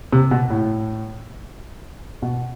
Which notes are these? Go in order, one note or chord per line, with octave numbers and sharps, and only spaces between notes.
C3
B2
A2
B2